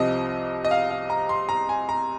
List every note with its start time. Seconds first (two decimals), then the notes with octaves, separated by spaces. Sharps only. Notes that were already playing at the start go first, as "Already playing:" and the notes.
Already playing: C2 C3 F3 D#5
0.65 D#5
0.71 F5
0.90 F5
1.10 A#5
1.29 C6
1.49 A#5
1.69 G#5
1.89 A#5